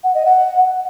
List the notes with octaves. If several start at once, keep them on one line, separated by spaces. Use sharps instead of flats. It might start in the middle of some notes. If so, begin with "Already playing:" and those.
F#5
D#5
F#5